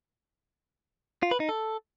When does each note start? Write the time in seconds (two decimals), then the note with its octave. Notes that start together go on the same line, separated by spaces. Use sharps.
1.23 F4
1.31 B4
1.40 D#4
1.49 A4